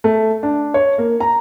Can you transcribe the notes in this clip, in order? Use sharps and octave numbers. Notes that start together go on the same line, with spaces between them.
A3
D4
C#5
A#3
A#5